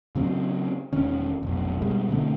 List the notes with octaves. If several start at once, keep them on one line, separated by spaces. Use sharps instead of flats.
C#3 F#3 C4
E1 D#3 C#4
F1 B1
B2 G3 G#3
B2 D3 A3 C4